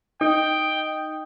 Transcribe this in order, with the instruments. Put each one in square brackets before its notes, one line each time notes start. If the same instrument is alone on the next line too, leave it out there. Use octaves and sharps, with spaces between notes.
[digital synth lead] D#4 [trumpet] G5